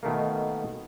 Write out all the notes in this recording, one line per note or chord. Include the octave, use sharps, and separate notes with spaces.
B2 D#3 A3 A#3